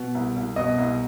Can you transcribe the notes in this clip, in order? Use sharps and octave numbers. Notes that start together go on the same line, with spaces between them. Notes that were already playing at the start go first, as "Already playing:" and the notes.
Already playing: B2
C2
C2
B2 D#5
C2